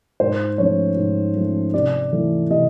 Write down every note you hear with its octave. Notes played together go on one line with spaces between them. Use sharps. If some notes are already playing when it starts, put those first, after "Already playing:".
G#2 C5
F3 A3 C#4 C#5
G#2
F3 A3 C#4
C3 D5
E3 A3
C3 D#5